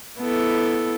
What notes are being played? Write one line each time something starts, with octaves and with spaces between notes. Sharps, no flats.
B3 E4 A4